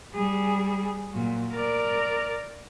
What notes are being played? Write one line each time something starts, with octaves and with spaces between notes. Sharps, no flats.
G3 G#4
A#2 F#3
A#4 D5